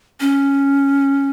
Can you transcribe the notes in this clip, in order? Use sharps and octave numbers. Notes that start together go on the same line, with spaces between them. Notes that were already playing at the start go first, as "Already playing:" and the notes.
C#4